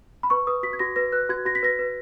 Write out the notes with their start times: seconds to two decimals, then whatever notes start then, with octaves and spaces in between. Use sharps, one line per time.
0.23 B5
0.30 B4 C#6
0.47 B4 D#6
0.63 F#4 B6
0.73 G#6
0.79 F#4 A#6
0.96 B4 A#6
1.12 B4 F#6
1.29 F#4 G#6
1.45 F#4 A#6
1.55 B6
1.63 B4 A#6
1.79 B4